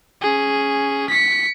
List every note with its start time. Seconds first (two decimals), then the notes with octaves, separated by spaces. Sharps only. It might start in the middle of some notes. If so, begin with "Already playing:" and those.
0.21 C#4 G#4
1.10 B6 C#7